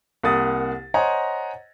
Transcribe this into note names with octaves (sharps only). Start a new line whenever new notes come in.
C2 A#3 F#5 D#6 A6
C5 C#5 D#5 F#5 G#5 A#5